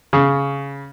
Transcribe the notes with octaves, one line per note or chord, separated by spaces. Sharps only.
C#3